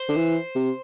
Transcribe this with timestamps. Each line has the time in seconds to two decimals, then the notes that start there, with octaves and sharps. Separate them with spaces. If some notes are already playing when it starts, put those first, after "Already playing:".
Already playing: C5
0.08 D3
0.16 E3
0.55 C3